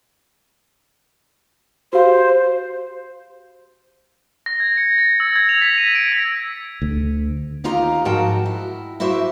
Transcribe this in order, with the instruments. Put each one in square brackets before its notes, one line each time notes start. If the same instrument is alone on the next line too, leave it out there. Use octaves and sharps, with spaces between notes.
[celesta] F#4 G4 F5 [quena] C5
[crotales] A#6
G#6
C#7
A6
E6
G#6
F7
B6
D#7
D7
B6
[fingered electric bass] D2
[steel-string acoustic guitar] D#2 D#4 F4 G4 A#5
G#2 F3 F#4 A#4 G5 A5
E4
E4 F#4 G4 C5 E5